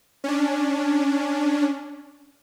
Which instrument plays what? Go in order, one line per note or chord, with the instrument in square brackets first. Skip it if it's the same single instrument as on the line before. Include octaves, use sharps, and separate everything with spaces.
[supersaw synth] C#4 D4